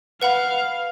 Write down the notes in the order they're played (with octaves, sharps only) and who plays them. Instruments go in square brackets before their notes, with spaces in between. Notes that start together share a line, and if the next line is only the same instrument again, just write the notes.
[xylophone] B4 F#5 B5 [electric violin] F5